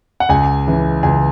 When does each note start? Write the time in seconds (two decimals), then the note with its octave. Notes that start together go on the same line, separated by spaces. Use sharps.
0.20 F#5
0.29 C#2 G#5
0.66 C#3 E3
1.03 C#2 G#5